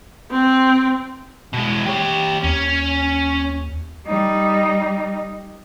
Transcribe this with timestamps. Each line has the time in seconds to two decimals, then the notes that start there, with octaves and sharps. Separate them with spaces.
0.31 C4
1.53 B2 G#3
1.86 G4 C#5
2.44 D#2 C#4
4.07 G3 D#4